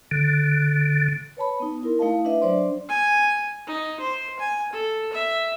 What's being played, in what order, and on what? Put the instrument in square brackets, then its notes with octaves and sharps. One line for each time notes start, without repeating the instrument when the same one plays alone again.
[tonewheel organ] D3
[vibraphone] B4 C#5 A5 B5
B3 D#4
E4 A#4 C6
A3 D#4 E4 D#5 F5 A5
D4 B4 D#5 E5
F#3 D4 C5 D5 C6
[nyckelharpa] G#5
D#4
C5
G#5
A4
E5